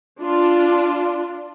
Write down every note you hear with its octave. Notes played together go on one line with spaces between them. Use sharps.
D4 F4